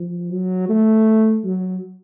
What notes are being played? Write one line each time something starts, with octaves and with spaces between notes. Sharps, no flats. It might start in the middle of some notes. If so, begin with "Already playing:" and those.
Already playing: F3
F#3
A3
F#3